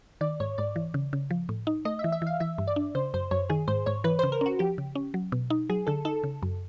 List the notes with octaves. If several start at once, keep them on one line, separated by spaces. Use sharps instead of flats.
D#3 D5
G#2 C#5
G#2 D5
E3
C#3
C#3
F3
A2
D#4
A3 D#5
E5
E3
E5
E3 F5
E3 E5
G2
D5
D4
C#3 C5
F#2 C5
F#2 C#5
D#3 G#4
G#2 C5
G#2 C#5
E3 B4
C#3 C5
A#4
C#4 F#4
F3 G4
C#3
C#4
F#3
B2
D#4
F#3 G#4
D3 A4
D#4 A4
C#3
F#2